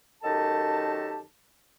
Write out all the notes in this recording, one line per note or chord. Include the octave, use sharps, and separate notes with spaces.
F#2 D#3 D#4 G4 A4 A5